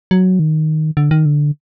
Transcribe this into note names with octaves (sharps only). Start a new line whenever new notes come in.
F#3
D#3
D3
D#3
D3